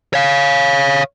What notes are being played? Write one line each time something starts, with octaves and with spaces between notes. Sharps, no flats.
C#5 F5